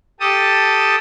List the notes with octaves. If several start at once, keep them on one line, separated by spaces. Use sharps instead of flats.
G4 A4 A5 D#6